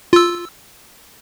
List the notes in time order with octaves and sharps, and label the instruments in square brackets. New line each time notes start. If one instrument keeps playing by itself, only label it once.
[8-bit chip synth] F4 E6